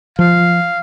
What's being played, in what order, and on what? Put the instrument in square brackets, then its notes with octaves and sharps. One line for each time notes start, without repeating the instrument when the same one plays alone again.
[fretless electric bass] F3 [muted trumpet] F5